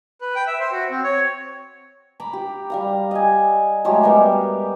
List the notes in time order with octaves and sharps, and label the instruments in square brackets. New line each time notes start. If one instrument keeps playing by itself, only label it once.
[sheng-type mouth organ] B4
G5
E5
C5
F#4
C4
C#5
[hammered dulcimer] A#5 B5 D6
G4
G3 F5 A#5
D#5 G#5
F#3 G#3 A3 G4
G3 B3 G4 A#4